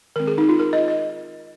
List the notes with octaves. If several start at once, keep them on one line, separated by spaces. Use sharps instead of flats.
D#3 G#3 C4 A#4
G#4
D#4
F4
A#4
D#5
D#5